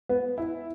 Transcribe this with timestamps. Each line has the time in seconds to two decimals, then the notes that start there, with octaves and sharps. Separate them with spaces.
0.09 B3
0.38 E4